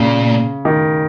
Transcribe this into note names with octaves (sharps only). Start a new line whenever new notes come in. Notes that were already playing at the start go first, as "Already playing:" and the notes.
Already playing: A#2 C#3
D#3